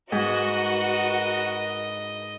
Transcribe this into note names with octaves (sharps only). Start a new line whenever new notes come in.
G#2 F#4 A#4 B4 D#5